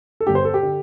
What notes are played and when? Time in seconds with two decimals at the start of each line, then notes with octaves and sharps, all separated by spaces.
0.20 A4
0.26 G1 G2 D3 G4
0.35 C5
0.45 A4
0.54 G4
0.63 D3